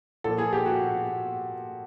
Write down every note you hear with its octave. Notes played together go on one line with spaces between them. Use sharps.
A#2 F3 A4
G#4
G4
F#4